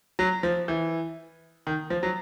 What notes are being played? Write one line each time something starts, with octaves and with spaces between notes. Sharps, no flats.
F#3
F3
E3
D#3
F3
F#3